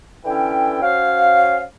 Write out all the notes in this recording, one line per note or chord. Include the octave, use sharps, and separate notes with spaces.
D3 E3 C#4 E4 A4 G5
C#4 F#4 C5 C#5 F5